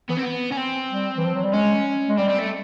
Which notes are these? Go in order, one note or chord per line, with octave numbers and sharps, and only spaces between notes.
E3 B3
C4
B3
C#4
C4
G3
E3
F3
F#3
G3
G#3 C#4
G#3
G3 C4
C4
A3